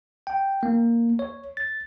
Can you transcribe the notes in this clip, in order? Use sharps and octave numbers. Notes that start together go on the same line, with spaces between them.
G5
A#3
C#5
A6